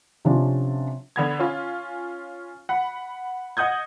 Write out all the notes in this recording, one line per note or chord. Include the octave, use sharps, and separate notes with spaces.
C3 F3 C#4 D4
D3 B3 G#6
C#4 F4
F#5 B5
D#5 F#5 D#6 G6 G#6